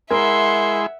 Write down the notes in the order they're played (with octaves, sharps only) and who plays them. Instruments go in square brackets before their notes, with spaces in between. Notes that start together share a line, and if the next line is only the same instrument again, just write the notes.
[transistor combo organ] G#3 E4 G#4 [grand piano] A#4 [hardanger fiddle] E5 F#5 [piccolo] C6